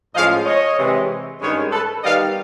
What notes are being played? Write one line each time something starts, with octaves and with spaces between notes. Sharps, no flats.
A2 F3 G#3 C#4 D#5 F5
C#5 D#5
C3 E3 G#3
G2 D#3 G#3 C#4 B4 C#5
A4 B4
D#3 G3 B3 D#5 F5